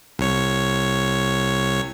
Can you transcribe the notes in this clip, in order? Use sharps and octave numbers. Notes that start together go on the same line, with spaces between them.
C2 C#5